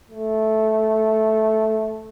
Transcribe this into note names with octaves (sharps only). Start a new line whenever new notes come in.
A3